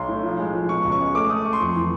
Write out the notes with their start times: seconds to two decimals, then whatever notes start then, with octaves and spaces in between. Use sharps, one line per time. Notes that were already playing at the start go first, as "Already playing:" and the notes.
Already playing: B1 C6
0.08 A2
0.23 F3
0.39 G#3
0.54 F3
0.69 B2 C#6
0.85 C#2
0.92 C#6
1.00 G#3
1.15 A3 D6
1.29 A3 D#6
1.45 A3 C#6
1.53 C6
1.60 F2 C#6
1.75 E3